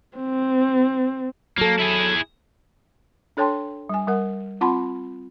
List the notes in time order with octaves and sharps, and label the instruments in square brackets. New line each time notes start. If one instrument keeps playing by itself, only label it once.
[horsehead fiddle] C4
[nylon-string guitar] F#3 A4 [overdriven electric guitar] A#3
[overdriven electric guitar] E4 G#4
[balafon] D4 A4 C#5 G5 A5 C6
G3 G#5
G3 A#4 F#5
C4 F4 F#5 A5 B5 C6